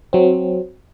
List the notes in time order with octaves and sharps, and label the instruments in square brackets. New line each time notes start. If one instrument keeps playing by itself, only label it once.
[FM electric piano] F#3 C4